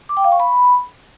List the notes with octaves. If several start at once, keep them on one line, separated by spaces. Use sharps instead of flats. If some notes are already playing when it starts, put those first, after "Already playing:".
D6
G5
F5
C#6
B5